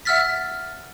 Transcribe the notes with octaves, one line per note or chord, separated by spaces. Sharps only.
E5 F#5 E6 F6 A6 B6